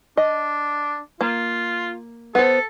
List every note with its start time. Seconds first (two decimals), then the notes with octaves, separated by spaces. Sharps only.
0.17 D4 D#5
1.21 A#3 F4
2.35 B3 A4 C5